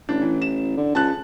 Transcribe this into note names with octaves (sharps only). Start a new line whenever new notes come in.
A1 D4
E3
E7
D3
C#2 A5 F#6